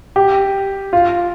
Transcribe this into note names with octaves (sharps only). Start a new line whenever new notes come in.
G4
F4